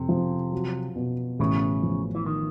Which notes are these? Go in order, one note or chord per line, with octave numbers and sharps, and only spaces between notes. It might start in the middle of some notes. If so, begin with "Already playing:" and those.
Already playing: F2 C3
F3
F#3
B2
A1 C#3
F3
E3
D#3